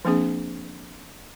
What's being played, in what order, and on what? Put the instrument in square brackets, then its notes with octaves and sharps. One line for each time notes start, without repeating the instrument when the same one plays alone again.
[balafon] F3 A#3 C4 D4 G#4